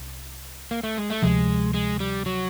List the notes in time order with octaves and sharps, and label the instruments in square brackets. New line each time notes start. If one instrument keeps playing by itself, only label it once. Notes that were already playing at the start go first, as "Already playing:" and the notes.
Already playing: [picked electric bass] C2
[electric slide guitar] A#3
A3
G#3
A3
[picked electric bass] D2 C3 F3 [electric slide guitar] G#3
[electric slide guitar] G#3
G3
F#3